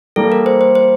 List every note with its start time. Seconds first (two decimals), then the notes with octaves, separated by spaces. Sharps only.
0.16 E3 G3 A#3 A4
0.32 A#4
0.46 C5
0.61 C5
0.75 C5